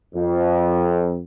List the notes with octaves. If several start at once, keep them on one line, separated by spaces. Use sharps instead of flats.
F2